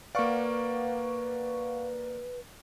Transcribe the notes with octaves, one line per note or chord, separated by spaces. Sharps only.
A#3 B4 D5 F5 F#5 C#6